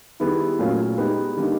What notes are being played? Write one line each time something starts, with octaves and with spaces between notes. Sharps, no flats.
D#3 G3 B3 E4 G#4
A#2 F#3 A3 C#4 F4
G#3 B3 D#4 G4 B4
D3 G3 A#3 D#4